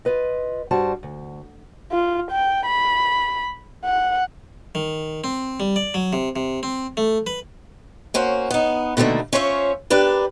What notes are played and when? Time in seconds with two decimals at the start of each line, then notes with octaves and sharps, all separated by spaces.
0.05 F4 B4 D#5
0.71 G2 G3 F#4 C5 A5
1.03 D2
1.92 F4
2.31 G5
2.66 B5
3.84 F#5
4.75 D#3
5.24 C4
5.60 G3
5.76 D5
5.94 F#3
6.13 C3
6.36 C3
6.63 C4
6.97 A3
7.27 B4
8.14 A#3 C#4 F#4 C5
8.51 B3 D#4
8.97 B2 D3 D#3 A3 A#3
9.33 C#4 F4 C5 C#5 D#5 E5
9.90 D4 G4 A#4 B4 D5